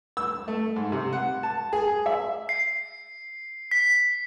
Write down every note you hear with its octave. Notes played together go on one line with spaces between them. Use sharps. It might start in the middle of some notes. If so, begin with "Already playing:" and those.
E6
A3
G#2
C3
F#5
A5
G#4
E5
C7
B6